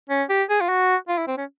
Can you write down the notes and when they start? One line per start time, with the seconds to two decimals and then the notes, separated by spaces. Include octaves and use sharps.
0.09 C#4
0.29 G4
0.49 G#4
0.61 F4
0.69 F#4
1.08 F4
1.18 E4
1.27 C4
1.37 C#4